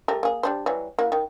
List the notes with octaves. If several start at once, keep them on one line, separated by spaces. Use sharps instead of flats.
G3 A3 A#4
A#3 G#4
G3 D4 C5
E3 F#3 G3
A#3 E4 F#4
D#3